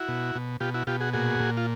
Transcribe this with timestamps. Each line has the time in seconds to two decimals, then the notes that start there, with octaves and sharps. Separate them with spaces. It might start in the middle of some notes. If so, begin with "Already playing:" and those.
Already playing: E4 F#4
0.08 B2
0.35 B2
0.60 B2 F4 G4
0.74 E4 F#4
0.87 B2 F4 G4
1.00 F#4 G#4
1.13 A#2 F#4 G#4
1.40 A#2
1.57 F4